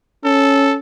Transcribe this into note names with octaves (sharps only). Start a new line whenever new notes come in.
C#4 A4